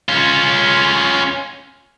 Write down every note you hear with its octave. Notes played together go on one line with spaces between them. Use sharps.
C#4 F4